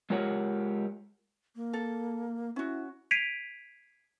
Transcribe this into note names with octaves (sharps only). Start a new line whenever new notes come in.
G#3 F4 G4 A#4 C#5 F#5
A#3
A4
C#4 E4 F#4
G#6 B6 C7 D7 D#7 F7